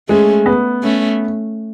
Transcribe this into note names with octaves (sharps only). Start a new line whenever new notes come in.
G#3 A3 C#4
B3
A3 C#4